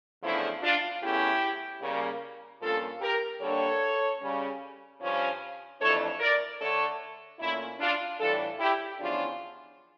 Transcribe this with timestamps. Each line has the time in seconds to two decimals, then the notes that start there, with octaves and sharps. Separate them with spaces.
0.21 E2 C#3 F3 A3 D4 E4
0.62 D4 F4
1.01 E2 E3 A3 C#4 E4 G4
1.81 C#3 G3 A#3
2.61 G2 F3 A#3 C#4 F4 A4
3.01 G4 A#4
3.40 D3 G3 A#3 D4 A4 C#5
4.21 C#3 G3 C#4
5.00 G2 F3 C#4
5.80 F2 E3 A3 D4 A4 C#5
6.20 A#4 D5
6.60 D3 A3 D4 A4 C#5
7.40 A#2 A3 C#4 E4
7.80 D4 F4
8.19 A2 E3 G3 D4 F4 A4
8.59 E4 G4
8.99 E2 C#3 F3 C#4 D4 F4